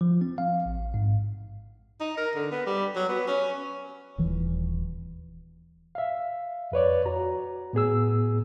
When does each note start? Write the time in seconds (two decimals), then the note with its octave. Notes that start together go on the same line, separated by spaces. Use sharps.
0.01 F3
0.21 C4
0.38 F5
0.66 A1
0.94 G#2
2.00 D#4
2.17 A#4
2.35 D3
2.51 B3
2.67 G3
2.96 F#3
3.09 B3
3.27 C#4
4.18 D#1 E3
5.95 E5 F5
6.72 F2 B4 C#5 D5
7.06 F#4 A#5
7.73 A2 B3 G#4 E6